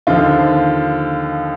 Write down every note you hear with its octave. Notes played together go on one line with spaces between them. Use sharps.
D#2 D3 F3 F4